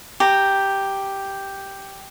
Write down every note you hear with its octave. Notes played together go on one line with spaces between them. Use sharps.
G4 A#5